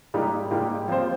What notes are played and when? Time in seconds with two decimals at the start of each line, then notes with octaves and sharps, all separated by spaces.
0.14 G#2 G3 A#3 D#4 G4
0.51 G#2 G3 A#3 D#4 G4
0.88 F3 C4 F4 C5